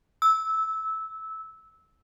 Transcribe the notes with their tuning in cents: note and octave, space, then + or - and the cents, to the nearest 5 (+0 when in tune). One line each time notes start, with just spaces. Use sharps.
E6 -15